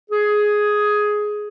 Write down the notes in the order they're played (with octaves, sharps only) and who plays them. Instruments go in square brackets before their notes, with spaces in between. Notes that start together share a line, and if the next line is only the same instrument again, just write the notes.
[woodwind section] G#4